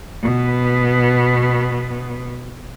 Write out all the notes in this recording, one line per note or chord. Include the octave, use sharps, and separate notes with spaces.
B2 B3